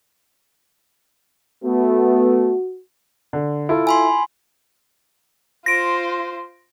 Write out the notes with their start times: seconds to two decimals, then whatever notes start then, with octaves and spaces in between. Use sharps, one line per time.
1.64 A3 B3 F#4
3.33 D3
3.69 E4 F4 A4
3.87 G#5 B5 C6
5.66 F4 C5 A#6 D7